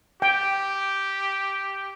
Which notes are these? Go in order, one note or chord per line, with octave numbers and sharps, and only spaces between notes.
G4 G5